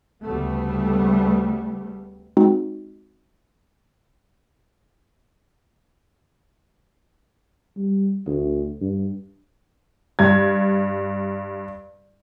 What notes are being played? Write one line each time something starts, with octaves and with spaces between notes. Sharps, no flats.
D2 C#3 G3 A3 B3
G#3 C4 D#4 F#4
G3
D2
G2
G2 G#6